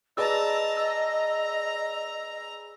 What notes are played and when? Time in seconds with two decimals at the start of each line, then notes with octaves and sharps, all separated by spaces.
0.17 G#4 B4 D5 D#5 A5 A#5 E6
0.77 A#5 E6